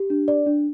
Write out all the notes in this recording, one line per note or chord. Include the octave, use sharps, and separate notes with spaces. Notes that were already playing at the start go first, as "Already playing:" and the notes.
Already playing: G4
D4
D5
D4